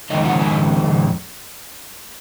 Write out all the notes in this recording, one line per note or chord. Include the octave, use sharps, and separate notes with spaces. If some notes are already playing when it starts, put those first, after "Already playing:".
F2 D#3 G#3 D#4 D#5
F#5
G#5